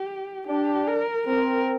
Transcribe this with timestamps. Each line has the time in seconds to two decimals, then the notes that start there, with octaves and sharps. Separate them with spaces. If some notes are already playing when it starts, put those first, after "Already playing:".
Already playing: G4
0.47 D4 G4
0.88 A#4
1.27 C4 A#4